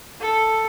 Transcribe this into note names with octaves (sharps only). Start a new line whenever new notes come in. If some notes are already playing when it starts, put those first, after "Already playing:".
A4